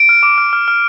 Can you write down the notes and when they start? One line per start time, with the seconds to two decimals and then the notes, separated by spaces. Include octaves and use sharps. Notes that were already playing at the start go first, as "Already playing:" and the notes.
Already playing: D7
0.09 F6
0.23 D6
0.38 F6
0.53 F6
0.68 F6